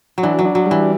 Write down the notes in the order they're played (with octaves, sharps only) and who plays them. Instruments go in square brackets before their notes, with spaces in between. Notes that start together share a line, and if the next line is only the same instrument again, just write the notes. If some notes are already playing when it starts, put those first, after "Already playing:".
[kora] F#3
[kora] E3 [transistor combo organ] D4
[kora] F#3
[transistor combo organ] D4
[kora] F#3
[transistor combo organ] G3
[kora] E3